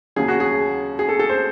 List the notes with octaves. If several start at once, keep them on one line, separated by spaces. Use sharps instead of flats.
D#2 C#3 F#3 G#4
F#4
G#4
G#4
A4
A4
C5